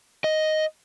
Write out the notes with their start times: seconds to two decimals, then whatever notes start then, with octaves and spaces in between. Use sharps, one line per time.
0.24 D#5